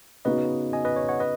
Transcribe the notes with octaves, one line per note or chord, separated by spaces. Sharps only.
C#3 B3 D#4 F#4 B4 D#5
D#5 G#5
B4 D#5
C#5
C#5 F#5
B4 D#5